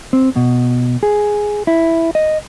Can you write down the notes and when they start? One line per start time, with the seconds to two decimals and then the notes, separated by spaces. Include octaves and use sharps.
0.13 C4
0.36 B2
1.03 G#4
1.67 E4
2.15 D#5